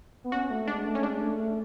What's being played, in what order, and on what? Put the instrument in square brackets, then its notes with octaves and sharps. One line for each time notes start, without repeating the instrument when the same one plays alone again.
[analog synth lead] B3
[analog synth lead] C#4 [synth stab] F#4
[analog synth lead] A3
[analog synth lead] G#3 [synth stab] D4
[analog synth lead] A3
[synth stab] C#4
[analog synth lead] G#3 [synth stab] D4
[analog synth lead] A3
A3